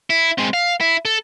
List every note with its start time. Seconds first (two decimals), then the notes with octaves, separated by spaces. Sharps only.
0.10 E4
0.38 G#3 C4
0.54 F5
0.81 E4
1.05 A4